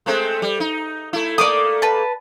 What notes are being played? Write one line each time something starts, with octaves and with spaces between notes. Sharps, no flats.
G#3 A3 C4
G3
D#4
A3 E4
A3 A#3 D5 D6 D#6
B4 A5